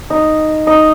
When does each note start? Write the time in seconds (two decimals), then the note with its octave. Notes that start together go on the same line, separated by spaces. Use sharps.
0.10 D#4
0.67 D#4